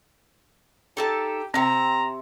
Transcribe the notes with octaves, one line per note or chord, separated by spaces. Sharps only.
D#4 G4 A4 A5
C3 C4 E5 A#5